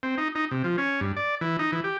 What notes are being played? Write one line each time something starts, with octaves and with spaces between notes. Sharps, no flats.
C4
D#4
D#4
C3
F3
C#4
G2
D5
E3
D#4
E3
G4